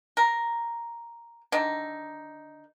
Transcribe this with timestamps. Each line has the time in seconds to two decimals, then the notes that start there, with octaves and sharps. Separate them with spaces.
0.17 A#4
1.52 D3 D#3 D#4